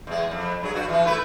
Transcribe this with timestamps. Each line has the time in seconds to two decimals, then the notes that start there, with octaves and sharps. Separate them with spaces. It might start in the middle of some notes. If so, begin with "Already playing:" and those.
0.07 E2 G#3
0.31 F2
0.62 G2 F#3 G#4
0.74 G2 F#4
0.89 E3 F4 F#4
1.04 A3 E4 B4